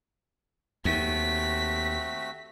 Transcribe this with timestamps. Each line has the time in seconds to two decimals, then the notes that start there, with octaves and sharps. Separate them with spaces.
0.85 D#2 A3 C4 F#4 B6